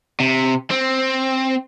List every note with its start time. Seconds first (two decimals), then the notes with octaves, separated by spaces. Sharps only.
0.20 C3
0.71 C4